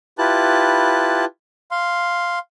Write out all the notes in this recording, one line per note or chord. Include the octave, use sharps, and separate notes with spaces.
E4 F4 G4 B4 A5 F#6
F5 C6